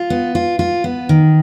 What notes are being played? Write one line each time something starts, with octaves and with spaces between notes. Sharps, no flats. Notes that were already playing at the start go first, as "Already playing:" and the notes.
Already playing: F4
B3
F4
F4
B3
D#3